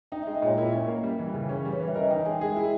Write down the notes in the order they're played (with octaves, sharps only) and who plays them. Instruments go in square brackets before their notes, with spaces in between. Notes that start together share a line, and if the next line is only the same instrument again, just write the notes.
[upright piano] D#4 [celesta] G5
[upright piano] G#3 [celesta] E5
[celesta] D#5
[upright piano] A#2 [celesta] C#5
[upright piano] E4 [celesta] A#4
[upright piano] C#4
A#3
G3
E3
C#3
[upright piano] C#4 [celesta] B4
[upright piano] G3
[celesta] C#5
[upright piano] E3
[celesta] E5
[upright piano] A#4 [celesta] D#5
[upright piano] D#4 [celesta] G5
[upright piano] G#3 [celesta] G#5
[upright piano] G#4 [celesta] E5
[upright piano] E4